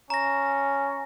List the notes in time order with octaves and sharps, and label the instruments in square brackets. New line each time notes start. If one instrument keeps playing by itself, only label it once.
[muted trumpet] C#4 [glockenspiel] A#5 A#6